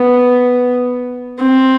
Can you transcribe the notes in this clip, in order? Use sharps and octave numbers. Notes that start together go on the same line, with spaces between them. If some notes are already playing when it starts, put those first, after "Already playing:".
Already playing: B3
C4